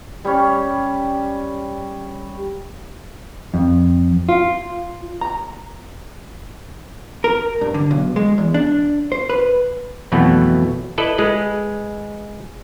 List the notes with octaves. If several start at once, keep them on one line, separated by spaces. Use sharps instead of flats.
G3 C#4
F2
F4
A#5
A#4
G2
D3
B1
G#3
E2
D4
C5
B4
F2 B2 E3 F#3 A3 B3
E4 A4 B4 D5 D#5
G#3 G#4 B4